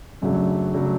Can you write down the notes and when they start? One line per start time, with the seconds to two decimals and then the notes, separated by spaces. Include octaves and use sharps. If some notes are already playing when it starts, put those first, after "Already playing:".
0.22 F#2 C#3 F#3 A3 D4
0.74 C#3 F#3 A3 D4